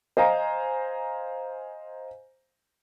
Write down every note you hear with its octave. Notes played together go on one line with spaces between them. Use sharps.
C5 D#5 F5 G#5 A#5